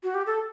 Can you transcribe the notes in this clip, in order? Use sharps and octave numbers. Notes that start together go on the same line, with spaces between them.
F#4
G4
A4